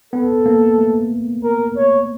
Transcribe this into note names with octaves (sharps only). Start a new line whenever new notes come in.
B3 A4
A#3
A3
A#4
C#5